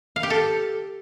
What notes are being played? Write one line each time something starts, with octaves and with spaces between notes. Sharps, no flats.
F5
G4
A4